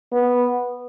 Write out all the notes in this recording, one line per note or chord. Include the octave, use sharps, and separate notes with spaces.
B3